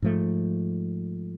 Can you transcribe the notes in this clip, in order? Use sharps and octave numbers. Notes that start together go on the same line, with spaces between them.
G#2 F3 A3